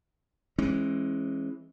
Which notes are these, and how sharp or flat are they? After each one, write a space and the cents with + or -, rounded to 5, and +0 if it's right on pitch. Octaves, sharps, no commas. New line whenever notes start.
E3 +0 G#3 +0 C#4 -40